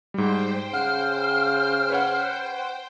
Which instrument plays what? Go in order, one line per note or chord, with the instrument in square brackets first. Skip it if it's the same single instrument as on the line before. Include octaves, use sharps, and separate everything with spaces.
[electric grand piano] G#2 G3 [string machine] C5 G5
[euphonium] C#3 [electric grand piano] F#5 [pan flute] F6
[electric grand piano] B4 C#5 F#5